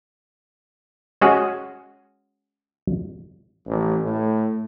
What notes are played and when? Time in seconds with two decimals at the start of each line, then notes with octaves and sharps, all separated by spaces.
1.21 G#3 C#4 F#4 G#4
3.66 A1
4.02 A2